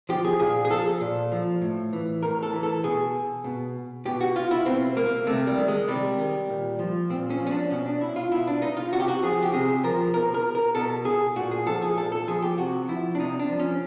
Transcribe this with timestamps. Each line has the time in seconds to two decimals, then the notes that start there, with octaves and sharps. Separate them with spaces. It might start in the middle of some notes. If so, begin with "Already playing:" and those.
0.09 F3 G4
0.25 G#4
0.40 A#2 G#4
0.65 G#4
0.70 F3 A4
1.01 A#2
1.32 F3
1.62 A2
1.93 E3
2.23 A2 A#4
2.43 A4
2.53 E3
2.63 A4
2.83 B2 G#4
3.44 B2
4.05 B2 G4
4.21 F#4
4.36 F4
4.51 E4
4.66 B2 C4
4.97 A#3
5.27 C3 A3
5.47 G3
5.58 D#3
5.68 G#3
5.88 C3 G3
6.18 D#3
6.49 A#2
6.79 F3
7.10 A#2 C4
7.30 C#4
7.40 F3
7.47 C#4
7.51 D4
7.71 B2 C#4
7.86 D4
8.01 E4
8.16 F4
8.31 B2 E4
8.47 D4
8.62 D#4
8.77 F4
8.92 C3 F#4
9.00 G4
9.08 F#4
9.23 F3 G#4
9.43 G4
9.53 C3 G#4
9.84 F3 A#4
10.14 B2 A#4
10.34 A#4
10.55 A#4
10.75 B2 A4
11.05 G#4
11.36 A#2 F#4
11.51 G#4
11.66 F3 A4
11.82 G#4
11.97 A#2 A4
12.12 A4
12.28 F3 G#4
12.43 G4
12.58 C3 F#4
12.88 F3 E4
13.15 D4
13.19 C3 D#4
13.39 D4
13.49 F3
13.60 C#4